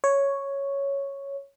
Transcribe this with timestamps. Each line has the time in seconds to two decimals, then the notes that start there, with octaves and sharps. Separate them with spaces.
0.04 C#5